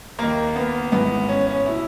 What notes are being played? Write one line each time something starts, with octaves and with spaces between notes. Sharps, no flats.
D#2 D#3 A#3
B3
G#1 G#2 E3 B3
C#4
C#4
B2 E4